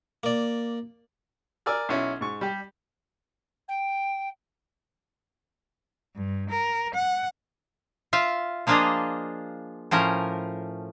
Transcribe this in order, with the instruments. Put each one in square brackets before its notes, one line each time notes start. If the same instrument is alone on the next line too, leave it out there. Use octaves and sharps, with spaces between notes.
[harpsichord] A#3 D5
[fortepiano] A#4 D5 G#5 E6 F6
B1 C#4 E4
G#2 C#6
G3 G4
[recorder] G5
[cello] G2
A#4
F#5
[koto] F4 E5 F5
F3 A#3 D4 F4 G#4 D#5
A2 F3 C#4 A#4